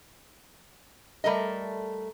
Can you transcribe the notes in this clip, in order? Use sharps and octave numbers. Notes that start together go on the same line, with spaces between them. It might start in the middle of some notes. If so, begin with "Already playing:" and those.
G3 A3 A#4 D#5